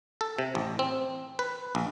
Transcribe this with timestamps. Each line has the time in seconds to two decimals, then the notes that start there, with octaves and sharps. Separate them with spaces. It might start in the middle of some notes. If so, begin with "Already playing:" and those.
0.21 A4
0.39 C3
0.55 A1
0.79 C4
1.39 B4
1.75 A#1